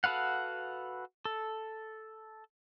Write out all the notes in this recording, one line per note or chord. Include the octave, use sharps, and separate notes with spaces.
F#4 A4 B4 F5 F#5
A4